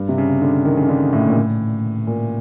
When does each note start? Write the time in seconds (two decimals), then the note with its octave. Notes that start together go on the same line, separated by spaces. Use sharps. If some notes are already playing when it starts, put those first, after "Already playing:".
Already playing: G2
0.09 C3
0.18 C#3
0.42 D3
0.65 D#3
0.77 C#3
0.89 D3
1.13 A2
1.28 A#2
1.37 A2
2.07 A#2